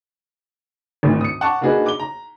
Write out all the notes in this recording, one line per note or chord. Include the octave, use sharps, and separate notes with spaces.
G#1 D2 A2
D#6 C#7
F#5 A5 C#6 D6
A#3 D4 D#4 F#4 G#4 B4
D6 G7
A#5